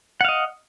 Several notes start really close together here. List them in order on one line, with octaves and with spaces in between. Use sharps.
F#5 F5 D#5